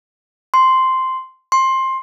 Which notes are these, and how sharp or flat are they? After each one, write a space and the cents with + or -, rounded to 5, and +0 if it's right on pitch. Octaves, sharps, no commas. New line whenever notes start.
C6 -5
C6 +15